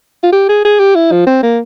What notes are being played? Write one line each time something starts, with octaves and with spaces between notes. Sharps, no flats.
F4
G4
G#4
G#4
G4
E4
F3
C4
A#3